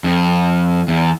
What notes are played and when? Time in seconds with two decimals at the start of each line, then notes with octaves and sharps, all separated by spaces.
0.04 F2
0.88 E2